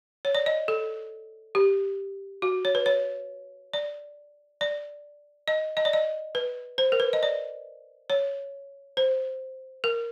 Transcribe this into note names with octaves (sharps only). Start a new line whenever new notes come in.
C#5
D5
D#5
A4
G4
F#4
C#5
B4
C#5
D5
D5
D#5
D#5
D5
D#5
B4
C5
A#4
B4
D#5
D5
C#5
C5
A#4